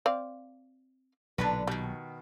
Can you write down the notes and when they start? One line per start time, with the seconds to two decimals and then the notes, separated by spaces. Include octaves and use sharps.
0.06 C4 D5 F5
1.38 B1 A#2 D3 D4 B4
1.67 B2 D#3 G3